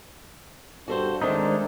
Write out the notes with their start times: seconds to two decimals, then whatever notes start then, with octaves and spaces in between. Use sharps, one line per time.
0.88 G2 F#4 A4 C5
1.22 D#3 G#3 A3 C4 D4 D#4 A4 C5